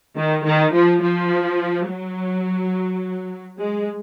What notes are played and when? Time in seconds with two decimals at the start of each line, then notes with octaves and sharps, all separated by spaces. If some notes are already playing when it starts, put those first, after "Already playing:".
0.17 D#3
0.45 D#3
0.74 F3
1.02 F3
1.87 F#3
3.58 G#3